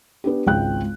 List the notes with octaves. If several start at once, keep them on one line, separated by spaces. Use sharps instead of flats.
B3 D4 G4
G#1 C#2 G5 F#6